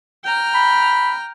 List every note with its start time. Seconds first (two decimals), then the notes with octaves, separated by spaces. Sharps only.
0.24 G5 A#5 F6
0.55 B5